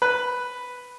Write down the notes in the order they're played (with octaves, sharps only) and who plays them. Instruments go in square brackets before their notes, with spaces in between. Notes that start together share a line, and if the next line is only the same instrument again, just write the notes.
[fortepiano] B4 F#6